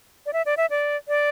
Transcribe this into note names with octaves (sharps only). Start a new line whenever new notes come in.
D5
E5
D5
E5
D5
D5